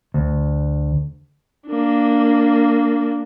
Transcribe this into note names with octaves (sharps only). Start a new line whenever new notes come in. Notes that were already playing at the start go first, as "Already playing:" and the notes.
D2
A#3 D4